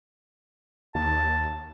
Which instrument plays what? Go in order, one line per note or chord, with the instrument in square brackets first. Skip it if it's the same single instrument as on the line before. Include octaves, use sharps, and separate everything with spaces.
[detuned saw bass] D#2 [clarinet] A5